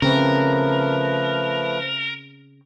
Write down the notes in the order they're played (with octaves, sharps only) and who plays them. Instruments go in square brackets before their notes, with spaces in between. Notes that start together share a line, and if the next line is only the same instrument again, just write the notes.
[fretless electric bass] C#3 C4 [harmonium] F3 A3 B4 [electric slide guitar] A#4